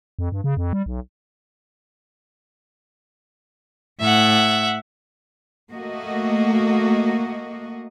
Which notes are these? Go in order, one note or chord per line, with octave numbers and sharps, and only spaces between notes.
F2
G2
C#3
F2
G3
B1
A2 E5 F#5
A3 A#3 F#4 D#5